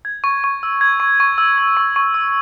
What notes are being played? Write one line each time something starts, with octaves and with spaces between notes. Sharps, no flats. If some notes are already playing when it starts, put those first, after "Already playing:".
G#6
C#6
C#6
E6
G#6
C#6
C#6
E6
G#6
C#6
C#6
E6